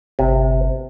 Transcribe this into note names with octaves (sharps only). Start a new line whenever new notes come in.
G1 C3